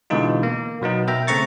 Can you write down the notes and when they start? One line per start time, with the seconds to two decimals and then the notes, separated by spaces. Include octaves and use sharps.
0.10 B2 D3 E3 G#3 D#4 F4
0.43 A#3
0.81 B2 F#3 B3 D#4
1.07 B2 A#4 E5 G5 A#5
1.27 C#3 A3 C4 A#5 C#6 A6